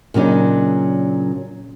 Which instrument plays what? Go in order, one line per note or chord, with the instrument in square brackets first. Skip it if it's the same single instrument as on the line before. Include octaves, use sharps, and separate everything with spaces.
[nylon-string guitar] A#2 C#3 F#3 D4 D#4